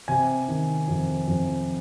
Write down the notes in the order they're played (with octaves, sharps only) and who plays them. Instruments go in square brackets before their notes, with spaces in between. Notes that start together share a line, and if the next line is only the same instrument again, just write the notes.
[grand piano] C3 G#5
D#3
F2
F2